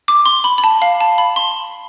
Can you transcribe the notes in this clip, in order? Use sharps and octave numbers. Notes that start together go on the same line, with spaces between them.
D6
C6
B5
B5
A5
F5
A5
B5
C6